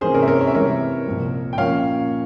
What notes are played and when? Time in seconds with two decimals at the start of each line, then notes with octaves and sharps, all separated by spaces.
0.01 C3 E3 A#3 C#4 G#4 C5
0.14 A#4 C#5
0.22 E5
0.27 A#4 C#5
0.41 C#5
0.47 E5
0.54 C3 E3 G3 A#4 C#5
1.06 C2 A#2 F3 C4
1.53 G5
1.58 A#2 F3 A#3 C#4 C#5 F5